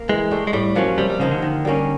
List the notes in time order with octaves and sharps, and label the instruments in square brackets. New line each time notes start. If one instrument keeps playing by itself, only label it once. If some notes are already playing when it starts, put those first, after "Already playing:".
Already playing: [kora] A#3
[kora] E3 [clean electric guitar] G#3
[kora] A3 D4 G4
[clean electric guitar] G#3
[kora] A2 [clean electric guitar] G3
[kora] F3 A#3 C#4 [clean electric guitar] F#3
[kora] C3 [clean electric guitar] G3
[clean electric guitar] G3
[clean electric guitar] C#3 [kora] F3 A#3 D#4
[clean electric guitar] D3
[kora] D#3
G3 A#3 C#4